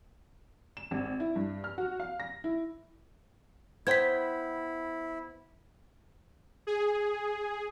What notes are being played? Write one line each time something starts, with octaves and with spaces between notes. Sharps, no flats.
E7
G#1
E4
G2
F6
F#4
F5
A#6
E4
B3 E4 C5 G5 G#6 B6
G#4